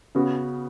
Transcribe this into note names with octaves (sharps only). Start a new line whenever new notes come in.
C#3 B3 F#4